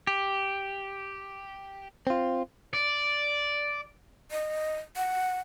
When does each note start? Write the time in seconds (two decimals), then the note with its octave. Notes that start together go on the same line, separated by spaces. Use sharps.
0.07 G4
2.07 C4 F4
2.73 D5
4.31 D#5
4.97 F#5